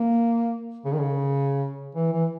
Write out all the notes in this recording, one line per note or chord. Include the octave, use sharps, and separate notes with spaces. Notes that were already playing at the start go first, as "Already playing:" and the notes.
Already playing: A#3
C#3
D#3
C#3
E3
E3